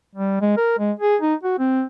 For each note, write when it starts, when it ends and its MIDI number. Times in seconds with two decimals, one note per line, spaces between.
0.16 0.37 55
0.41 0.57 56
0.57 0.74 70
0.79 0.92 56
1.00 1.16 68
1.22 1.35 63
1.43 1.57 66
1.59 1.83 60